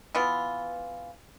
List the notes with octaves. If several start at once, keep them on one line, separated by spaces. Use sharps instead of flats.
E3 B3 F4